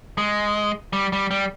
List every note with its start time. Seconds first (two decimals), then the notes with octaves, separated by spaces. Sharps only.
0.18 G#3
0.93 G3
1.13 G3
1.31 G3